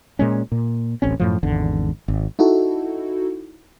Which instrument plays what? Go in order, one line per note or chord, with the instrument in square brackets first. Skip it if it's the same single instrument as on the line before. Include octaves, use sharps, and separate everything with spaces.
[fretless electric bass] A#2 G#3 C#4
A#2
D1 A1 C4 C#4
F#2 A2 F3
G#1 E2 D3
G#1
[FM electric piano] D#4 E4 F#4 A4